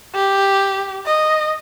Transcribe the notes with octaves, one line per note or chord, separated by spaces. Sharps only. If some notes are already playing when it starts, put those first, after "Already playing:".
G4
D#5